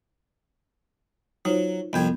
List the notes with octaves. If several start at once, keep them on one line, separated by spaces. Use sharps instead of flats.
F#3 D#4 F4 C5
C2 F2 B3 G5 G6 G#6